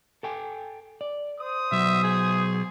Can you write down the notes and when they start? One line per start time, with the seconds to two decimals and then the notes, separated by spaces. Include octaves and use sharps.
0.23 A4 G5 G#5
1.01 D5
1.39 C5 D#6
1.72 B2 F#3 E5
2.04 G#4